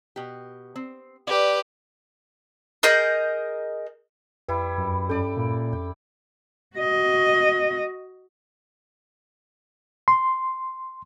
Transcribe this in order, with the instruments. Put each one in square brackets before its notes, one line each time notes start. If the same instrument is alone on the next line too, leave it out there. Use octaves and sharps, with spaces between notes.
[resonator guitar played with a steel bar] B2 G4
C4
[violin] G4 B4 [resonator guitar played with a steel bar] D5
[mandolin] G#4 A#4 D#5 G6
[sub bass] F2 [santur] G3 E4 [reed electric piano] B4
[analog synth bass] F#2
[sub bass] G2 [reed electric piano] C#4 A4 [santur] D5 G5
[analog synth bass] A#2
[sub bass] F2 [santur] G5
[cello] F#4 D#5
[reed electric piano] C6